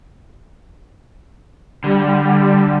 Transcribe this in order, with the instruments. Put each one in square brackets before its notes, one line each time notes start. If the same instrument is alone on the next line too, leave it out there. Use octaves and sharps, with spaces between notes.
[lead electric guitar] D3 [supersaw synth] G3